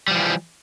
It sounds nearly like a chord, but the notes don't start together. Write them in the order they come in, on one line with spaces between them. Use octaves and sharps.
G3 F3 E3